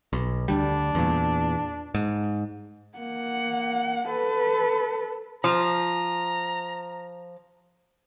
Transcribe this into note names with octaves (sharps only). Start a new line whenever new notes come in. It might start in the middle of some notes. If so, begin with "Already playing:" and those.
B1
D2 D3 G3 D4
E2 A#2
G#2
A#3 F#5
A4 B4
F3 A#5